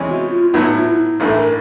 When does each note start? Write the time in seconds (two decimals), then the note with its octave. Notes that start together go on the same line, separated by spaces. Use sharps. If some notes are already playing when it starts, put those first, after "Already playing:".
Already playing: E2 C3 E3 G#3 C#4
0.09 F#4
0.31 F4
0.53 A2 F#3 B3 D#4 E4
0.77 F4
0.87 E4
1.20 A1 G2 E3 A3 A4
1.36 A#4